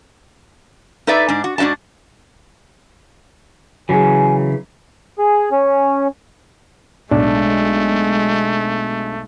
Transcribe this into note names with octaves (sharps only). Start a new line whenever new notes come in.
D#4 A4 B4 D5 E5
G#2 D4
F#4
G#2 D4 F#4 D#5 A5
C#3 E3 F#3 G#4 G#5
G#4
C#4
B1 G#3 A3 D4